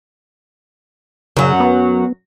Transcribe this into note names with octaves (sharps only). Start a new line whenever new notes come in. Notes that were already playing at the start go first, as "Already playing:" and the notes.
F#2 C#3 F#3
B3